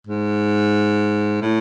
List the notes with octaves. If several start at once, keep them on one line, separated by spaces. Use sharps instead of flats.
G#2
A2